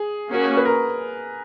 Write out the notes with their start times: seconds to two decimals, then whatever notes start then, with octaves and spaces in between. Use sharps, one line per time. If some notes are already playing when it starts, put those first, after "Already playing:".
Already playing: G#4
0.30 A#3 C#4 F#4
0.57 B4
0.65 A#4